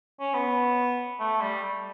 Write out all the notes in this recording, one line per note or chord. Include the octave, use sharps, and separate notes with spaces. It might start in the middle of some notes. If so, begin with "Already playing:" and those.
C#4
B3
A3
G3